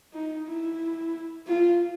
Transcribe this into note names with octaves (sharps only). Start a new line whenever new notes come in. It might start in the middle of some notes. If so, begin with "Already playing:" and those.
D#4
E4
F4